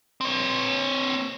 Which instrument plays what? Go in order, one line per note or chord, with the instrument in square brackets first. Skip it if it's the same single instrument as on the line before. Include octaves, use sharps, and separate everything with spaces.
[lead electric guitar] C4 C#5